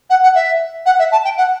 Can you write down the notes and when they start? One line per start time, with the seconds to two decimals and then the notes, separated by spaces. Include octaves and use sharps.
0.10 F#5
0.23 F#5
0.35 E5
0.86 F#5
0.99 E5
1.12 A5
1.24 G5
1.37 F#5